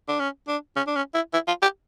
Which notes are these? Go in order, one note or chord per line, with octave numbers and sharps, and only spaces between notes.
D4
C#4
D4
C#4
D4
C#4
E4
E4
F4
G4